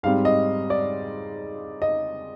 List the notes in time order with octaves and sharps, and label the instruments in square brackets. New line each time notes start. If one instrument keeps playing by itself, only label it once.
[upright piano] G#2 G3 C4 F5
D#5
D5
D#5